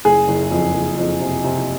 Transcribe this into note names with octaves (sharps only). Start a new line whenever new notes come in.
F#1 G#4
F#1
F2
F#1
F2
C3
C3